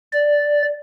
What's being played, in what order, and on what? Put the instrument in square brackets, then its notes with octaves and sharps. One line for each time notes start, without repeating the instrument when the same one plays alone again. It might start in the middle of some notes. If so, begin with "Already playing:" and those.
[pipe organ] D5